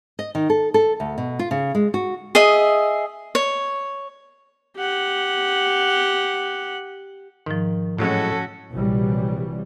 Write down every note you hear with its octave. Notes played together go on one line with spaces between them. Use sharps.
D#5
D#3
A4
A4
D2
B2
F4
C#3
G#3
F#4
G#4 D#5 E5
C#5
G4 F#5
G#2 D#3 F3
A2 F#3 G#3 C#4 F#4 A4
A#1 C3 E3 F#3 G3